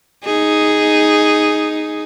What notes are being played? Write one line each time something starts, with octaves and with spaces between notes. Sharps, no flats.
D#4 G#4